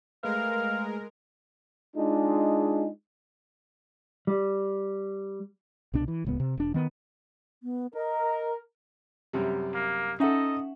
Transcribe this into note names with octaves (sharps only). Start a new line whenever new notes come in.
G#3 A3 A#4 B4 F5
G#3 D4 D#4 F4 G#4
G3
C2 B2 D4
E3
D1 C#2 B3
C3
E1 D4
D#3 B3
B3
A#4 D#5
F#2 C3 G3
A#3
C#4 D#4 A4 D#5 E5 F#5